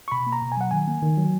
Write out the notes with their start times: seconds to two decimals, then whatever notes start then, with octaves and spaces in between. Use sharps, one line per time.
0.08 C#6
0.12 B2 B5
0.27 A#3
0.32 A#5
0.42 B2
0.52 G#5
0.57 F#3 F#5
0.71 D#3 G#5
0.88 A#3
1.02 D#3
1.18 F#3